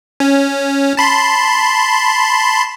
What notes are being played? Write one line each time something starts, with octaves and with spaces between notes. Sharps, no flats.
C#4
A5 B5 C6